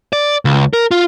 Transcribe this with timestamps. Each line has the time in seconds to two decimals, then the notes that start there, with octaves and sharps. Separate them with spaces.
0.13 D5
0.45 C#2
0.73 A#4
0.91 F4